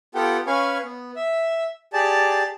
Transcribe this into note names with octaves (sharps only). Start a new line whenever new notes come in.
B3 F4 G4 A4 F#5 G5
C#4 B4 F5 G#5 C#6
B3
E5
G4 G#4 D5 A5